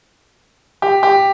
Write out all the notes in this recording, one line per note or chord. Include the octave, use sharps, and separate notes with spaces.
G4
G4